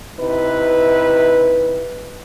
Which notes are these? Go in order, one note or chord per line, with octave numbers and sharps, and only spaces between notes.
C3 D#4 E4 B4